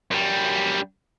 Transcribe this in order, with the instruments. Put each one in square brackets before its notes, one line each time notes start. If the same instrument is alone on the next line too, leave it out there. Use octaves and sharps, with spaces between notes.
[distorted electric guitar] F#2 G3